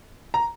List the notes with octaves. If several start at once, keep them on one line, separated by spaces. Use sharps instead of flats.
A#5